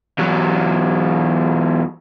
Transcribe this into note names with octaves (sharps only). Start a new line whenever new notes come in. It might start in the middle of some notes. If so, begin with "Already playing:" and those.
E2 F#3